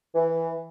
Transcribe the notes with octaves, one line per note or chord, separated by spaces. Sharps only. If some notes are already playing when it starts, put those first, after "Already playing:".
E3